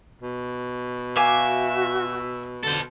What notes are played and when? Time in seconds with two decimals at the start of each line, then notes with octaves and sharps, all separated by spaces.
0.22 B2
1.16 F#4 E5 F5 G#5 D6
2.63 D3 A4 C5